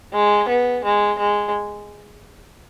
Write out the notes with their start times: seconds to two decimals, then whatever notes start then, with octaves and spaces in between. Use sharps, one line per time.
0.13 G#3
0.48 B3
0.84 G#3
1.19 G#3